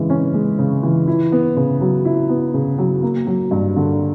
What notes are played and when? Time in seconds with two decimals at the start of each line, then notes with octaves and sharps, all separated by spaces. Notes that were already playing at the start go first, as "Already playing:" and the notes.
Already playing: C#3 E3 G#3
0.10 C#4
0.34 G#3
0.59 C#3
0.83 E3
1.07 E4
1.32 B3
1.57 C#3
1.81 F#3
2.05 E4
2.29 B3
2.54 C#3
2.78 F#3
3.03 A#3
3.27 F#3
3.51 G2
3.76 D3